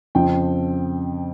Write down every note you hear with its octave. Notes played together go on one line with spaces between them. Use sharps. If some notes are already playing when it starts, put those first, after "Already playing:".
F2 C#3 F3 G5